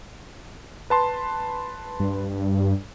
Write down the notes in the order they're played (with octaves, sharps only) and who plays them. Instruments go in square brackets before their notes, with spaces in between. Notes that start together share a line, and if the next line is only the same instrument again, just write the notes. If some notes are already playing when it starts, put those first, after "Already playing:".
[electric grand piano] B4 A5 C6
[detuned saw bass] G2